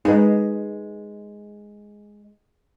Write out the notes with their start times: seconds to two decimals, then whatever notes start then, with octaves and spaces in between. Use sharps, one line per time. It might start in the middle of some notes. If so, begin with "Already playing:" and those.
0.05 G#3 D#4 B4